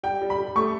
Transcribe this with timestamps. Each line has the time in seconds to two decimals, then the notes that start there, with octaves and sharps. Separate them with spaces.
0.03 G3 G5
0.22 G3
0.30 B5
0.38 G3
0.56 A3 C#6